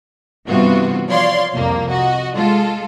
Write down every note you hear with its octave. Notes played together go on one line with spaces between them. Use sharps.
G2 C3 E3 B3 F4 F#4
F3 C#5 D5 F5 C6
C2 F2 A#3
F#4 D#5
G#3 F4 A4